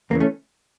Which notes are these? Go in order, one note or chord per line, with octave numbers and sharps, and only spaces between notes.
E2 C#3 E3 A#3
A3 C#4